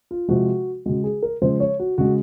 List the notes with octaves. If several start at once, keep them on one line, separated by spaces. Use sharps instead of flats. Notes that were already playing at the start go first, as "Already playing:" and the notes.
F4
C3 F3 G#3 F#4
C#3 G#3 F#4
G#4
A#4
C#3 F3 G#3 C5
C#5
F#4
C#3 G#3 F#4